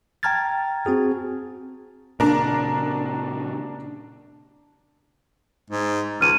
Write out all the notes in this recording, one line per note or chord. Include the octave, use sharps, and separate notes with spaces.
G5 A5 A#5 F6 G#6 A6
C4 F#4 G#4
A#2 C#3 D4 A#4
G#2
C#2 F6 D#7